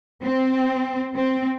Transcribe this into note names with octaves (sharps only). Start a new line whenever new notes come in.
C4
C4